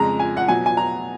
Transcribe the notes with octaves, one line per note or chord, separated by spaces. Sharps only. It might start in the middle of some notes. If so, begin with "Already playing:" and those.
Already playing: F2 C#3 F3 G#3 A#5
G#5
F#5
B2 F#3 G#5
G#5
A#5